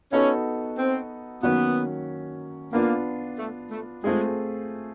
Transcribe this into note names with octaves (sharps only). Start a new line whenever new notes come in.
B3 C#4 D#4 F#4 A4
C4
D#3 F#3 A#3 B3 C#4 F#4
A#3 B3 D4 F4
A3
A3
G#3 A3 C4 F4 G#4